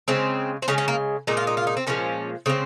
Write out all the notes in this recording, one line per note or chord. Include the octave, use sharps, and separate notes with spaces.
C#3 G#3 C4
C4
C#3 G#3 C#4
C#4
A#3
A#2 G#3 D#4
F4
D#4
F4
D#4
C4
A#2 F3 G#3 C#4
C#3 G#3 C4